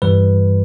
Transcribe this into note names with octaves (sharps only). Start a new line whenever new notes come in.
G2 E3 G3 B4